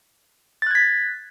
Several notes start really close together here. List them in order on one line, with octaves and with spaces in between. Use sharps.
A6 F#6 G#6 B6